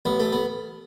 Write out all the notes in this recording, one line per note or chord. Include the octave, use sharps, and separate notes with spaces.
A1 B3
A3
B3